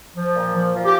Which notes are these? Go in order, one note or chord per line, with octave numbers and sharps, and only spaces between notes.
F3
A#2
F3
F3
G4